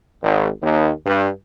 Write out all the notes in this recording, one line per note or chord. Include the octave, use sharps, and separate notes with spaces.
G#1
D#2
G2